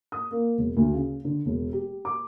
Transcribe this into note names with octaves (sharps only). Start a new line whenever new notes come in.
D#6
A#3
E1
D2
C#3
D3
E1
G4
D6